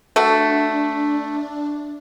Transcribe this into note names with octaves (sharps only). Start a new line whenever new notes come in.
A3 D4 F#4 A4